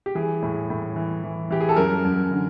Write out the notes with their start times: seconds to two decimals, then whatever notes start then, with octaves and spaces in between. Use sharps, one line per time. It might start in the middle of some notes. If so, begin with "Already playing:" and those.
0.06 G4
0.15 E3 G#4
0.42 A2
0.70 A2
0.96 E3
1.24 E3
1.50 E3 G4
1.60 G#4
1.69 A4
1.76 F#2 A#4
2.05 F#2
2.31 D3